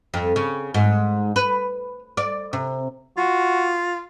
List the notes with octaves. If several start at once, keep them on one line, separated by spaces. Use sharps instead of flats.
F2
C#3
G#2
B4
D5
C3
F4 F#4